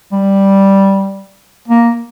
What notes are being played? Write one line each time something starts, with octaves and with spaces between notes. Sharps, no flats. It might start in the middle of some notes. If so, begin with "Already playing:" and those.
G3
A#3